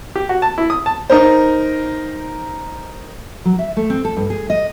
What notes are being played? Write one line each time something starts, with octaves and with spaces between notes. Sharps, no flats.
G4
F#4
A5
E4
D#6
A5
D#4 A#4 C5
F#3
E5
A3
C4
A4
G2
G#4
D#5